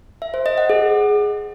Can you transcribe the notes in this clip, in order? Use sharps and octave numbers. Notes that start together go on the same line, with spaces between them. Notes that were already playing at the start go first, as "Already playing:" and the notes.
E5
C5
D#5
F#5
G#4